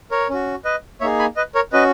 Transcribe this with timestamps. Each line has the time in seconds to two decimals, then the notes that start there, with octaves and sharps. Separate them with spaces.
0.11 A#4 C#5
0.29 C#4 F#4
0.65 B4 D#5
1.01 A#3 D#4 G#4 C#5 E5
1.19 G#5 B5
1.36 B4 D#5
1.55 A#4 C#5
1.72 C#4 F#4 B4 D#5